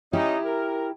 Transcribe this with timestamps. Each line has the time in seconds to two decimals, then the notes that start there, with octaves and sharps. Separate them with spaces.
0.13 C#4 D#4 E4 G4
0.45 A#4